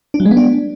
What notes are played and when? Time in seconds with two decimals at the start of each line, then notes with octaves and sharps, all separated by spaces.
0.14 D4
0.20 F#3
0.25 G#3
0.31 B3
0.37 D4